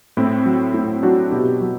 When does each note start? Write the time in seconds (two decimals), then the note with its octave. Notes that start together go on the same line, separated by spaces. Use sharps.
0.17 A2 C4 E4
0.46 F#3
0.74 A2 C4 E4
1.03 F#3 D4 F#4
1.31 B2 E4 G4
1.61 F#3